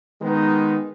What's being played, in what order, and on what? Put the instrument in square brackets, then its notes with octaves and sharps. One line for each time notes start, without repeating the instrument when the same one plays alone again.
[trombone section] D#3 G#3 B3 D#4